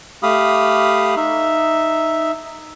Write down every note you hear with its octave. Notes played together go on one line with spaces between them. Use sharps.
A3 G4 F5 B5 D#6
D#4 E5